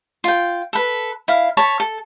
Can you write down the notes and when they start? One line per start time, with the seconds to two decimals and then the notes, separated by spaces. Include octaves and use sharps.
0.24 F4 G5
0.73 A4 B4
1.28 E4 F5
1.57 C#5 A5 B5
1.80 A4